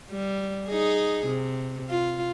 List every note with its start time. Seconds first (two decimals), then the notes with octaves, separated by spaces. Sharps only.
0.11 G3
0.67 D#4 G#4
1.27 C3
1.89 F4